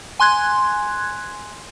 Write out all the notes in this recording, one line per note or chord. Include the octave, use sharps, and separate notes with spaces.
G#5 C6 F#6 G#6